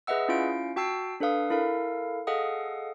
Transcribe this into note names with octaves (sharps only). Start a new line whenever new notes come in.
G#4 B4 D#5 E5 F#5 E6
C#4 E4 F4 F5 D7
F#4 G5 A5 E6 C7
D4 A4 B4 F5 D#6
E4 A4 A#4 F5
G#4 A4 D#5 F5 F#5 D#6